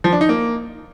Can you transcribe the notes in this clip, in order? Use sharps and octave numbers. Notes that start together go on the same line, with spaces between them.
F3
D4
D#4
A#3